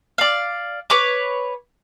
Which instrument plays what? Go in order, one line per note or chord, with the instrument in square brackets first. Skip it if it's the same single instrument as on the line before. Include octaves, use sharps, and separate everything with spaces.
[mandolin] D5 F5
B4 C#5 D6